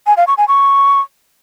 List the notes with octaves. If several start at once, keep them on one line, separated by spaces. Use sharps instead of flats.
G#5
F5
C#6
G#5
C#6